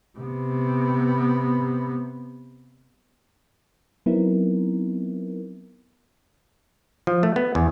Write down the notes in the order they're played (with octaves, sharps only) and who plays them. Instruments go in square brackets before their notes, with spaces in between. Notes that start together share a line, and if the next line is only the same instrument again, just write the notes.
[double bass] C3 B3
[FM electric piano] F#3 B3 C4 D#4 E4 A#4
[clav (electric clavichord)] F3
A3
B3
E2